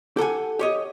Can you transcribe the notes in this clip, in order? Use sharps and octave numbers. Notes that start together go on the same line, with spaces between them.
G4 A4 F#5 G#5
G4 C#5 D#5